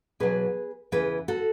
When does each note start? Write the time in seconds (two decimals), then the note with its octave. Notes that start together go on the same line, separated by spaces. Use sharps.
0.20 E2 B2 F#3 G#4 B4
0.92 E2 C#3 E3 G#4 B4
1.28 F#4 A4